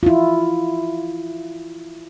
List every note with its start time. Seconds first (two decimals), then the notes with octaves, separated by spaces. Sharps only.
0.03 E4 F4